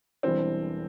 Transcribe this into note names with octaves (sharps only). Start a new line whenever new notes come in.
E1 E2 E3 G3 C4 D4